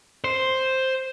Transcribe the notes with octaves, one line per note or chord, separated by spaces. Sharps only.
C5